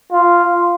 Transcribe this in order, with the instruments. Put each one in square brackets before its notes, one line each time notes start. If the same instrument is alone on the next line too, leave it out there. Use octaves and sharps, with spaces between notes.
[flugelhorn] F4